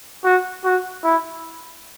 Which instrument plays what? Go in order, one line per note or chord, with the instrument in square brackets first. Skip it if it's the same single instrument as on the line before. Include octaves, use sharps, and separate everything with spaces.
[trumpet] F#4
F#4
E4